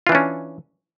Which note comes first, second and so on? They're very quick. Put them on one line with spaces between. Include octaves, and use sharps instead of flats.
F4 E3 D4 C#4